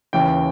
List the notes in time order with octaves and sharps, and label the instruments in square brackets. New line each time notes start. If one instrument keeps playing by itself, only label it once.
[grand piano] D#2 C#3 E3 G5